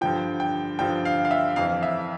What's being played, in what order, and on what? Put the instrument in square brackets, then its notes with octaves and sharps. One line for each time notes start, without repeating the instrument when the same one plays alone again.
[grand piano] G2 D3 F3 G5
G5
G2 D3 F3 G5
F5
F5
E5
F2 E3 F5
E5